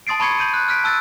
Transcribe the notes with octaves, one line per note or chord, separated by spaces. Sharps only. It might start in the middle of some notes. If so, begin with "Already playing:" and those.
A5 C6 D#6 A6 C7 D7
A5 B5 C#6 G#6 C7 C#7
C6 G6 D#7
F#6
F6 F#6 B6 D7
A5 E6 F#6 A6